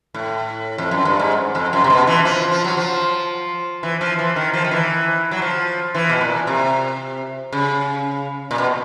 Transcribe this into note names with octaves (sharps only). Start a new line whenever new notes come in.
A2
F2
F#2
G2
G#2
F2
F#2
C3
B2
E3
F3
F3
F#3
F3
E3
F3
E3
D#3
F3
D#3
E3
F#3
F3
E3
B2
A#2
C3
C#3
A#2
B2